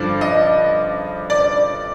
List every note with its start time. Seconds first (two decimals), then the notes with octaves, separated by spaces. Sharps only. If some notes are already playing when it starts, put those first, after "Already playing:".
Already playing: G2 D3 F3 D5
0.21 D#5
1.30 D5